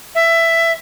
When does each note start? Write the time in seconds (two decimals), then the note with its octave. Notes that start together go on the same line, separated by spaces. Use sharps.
0.15 E5